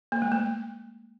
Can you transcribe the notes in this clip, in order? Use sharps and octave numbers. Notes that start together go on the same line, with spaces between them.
A#3
G#3
A3